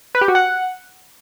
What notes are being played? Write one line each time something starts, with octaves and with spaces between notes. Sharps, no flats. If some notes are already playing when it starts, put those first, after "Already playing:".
B4
G4
F#4
F#5